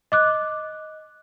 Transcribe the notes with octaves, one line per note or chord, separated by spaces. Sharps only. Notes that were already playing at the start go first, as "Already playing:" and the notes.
D#5 D6 F#6